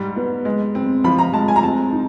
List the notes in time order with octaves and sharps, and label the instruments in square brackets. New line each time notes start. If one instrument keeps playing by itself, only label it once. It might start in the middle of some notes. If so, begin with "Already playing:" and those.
Already playing: [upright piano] G#2 G3
B3
G#3
C4
F3 B5
A#5
G#3 A5
G#5
A#5
C4 A5
D#4